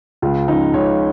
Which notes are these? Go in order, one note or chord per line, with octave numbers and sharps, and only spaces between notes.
C#2 F4
C#3 F3 D#4
C#2 C#5